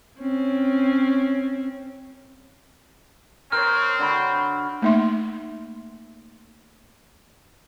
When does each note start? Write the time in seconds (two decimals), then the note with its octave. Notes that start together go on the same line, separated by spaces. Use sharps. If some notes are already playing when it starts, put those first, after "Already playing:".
0.20 C4 C#4
3.52 C4 A#4 C5 C#5 F6
3.99 D3 F#4 B5
4.82 A3 A#3 D#4 E5 C6